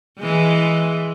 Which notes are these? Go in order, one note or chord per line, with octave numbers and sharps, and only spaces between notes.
E3 G#3